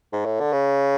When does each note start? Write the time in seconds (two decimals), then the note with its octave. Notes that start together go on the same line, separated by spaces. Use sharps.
0.12 G#2
0.25 A2
0.40 D3
0.52 C#3